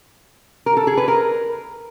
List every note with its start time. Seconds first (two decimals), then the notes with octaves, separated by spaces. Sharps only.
0.66 A#4
0.77 A4
0.87 G#4
0.97 B4
1.08 A#4